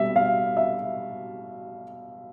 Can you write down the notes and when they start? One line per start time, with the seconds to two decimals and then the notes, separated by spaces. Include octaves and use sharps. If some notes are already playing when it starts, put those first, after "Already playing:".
Already playing: B2 G3 E5
0.16 F5
0.57 E5